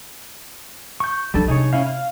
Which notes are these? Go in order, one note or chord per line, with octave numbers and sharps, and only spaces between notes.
C#6 G6
F3 G3 D4 A4
C3 D#4 G#4 C#5
C#4 E4 F5
F5